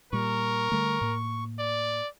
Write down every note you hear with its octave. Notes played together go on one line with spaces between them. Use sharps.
A#2 G3 A#4 C#6
D3 G3 A3
A2 A#3
D5